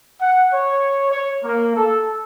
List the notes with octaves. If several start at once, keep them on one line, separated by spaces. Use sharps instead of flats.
F#5
C#5
C#5
A#3
A4